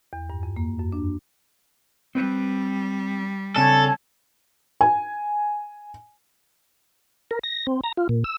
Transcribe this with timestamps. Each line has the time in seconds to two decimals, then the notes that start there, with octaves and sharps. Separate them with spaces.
0.13 E2
0.30 G2
0.43 F2
0.56 A#3
0.79 F#2
0.92 D4
2.15 G3 C4 B4
3.56 C#3 C4 D4 A4 C#5 G#5 A5
4.81 G#5
7.31 A#4
7.43 A#6
7.67 C4
7.84 A#5
7.97 F4
8.09 A#2
8.24 E6